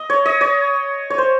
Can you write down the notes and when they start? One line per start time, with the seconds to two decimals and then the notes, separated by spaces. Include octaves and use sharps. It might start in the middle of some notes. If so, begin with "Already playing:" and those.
Already playing: D#5
0.10 C#5
0.26 D#5
0.41 C#5
1.10 C#5
1.18 C5